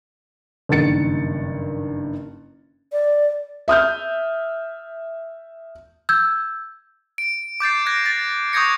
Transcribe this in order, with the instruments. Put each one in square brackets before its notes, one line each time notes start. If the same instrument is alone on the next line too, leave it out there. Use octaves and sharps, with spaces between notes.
[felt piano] F#1 G2 D#3 A6 C#7
[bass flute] D5
[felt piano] E5 D#6 F6 G6
[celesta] E6 G6 G#6
[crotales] D7
D6 G6 A6 C7
F#6 G#6 A#6 D7
A6
C#6 D#6 G6 G#6 A#6 C#7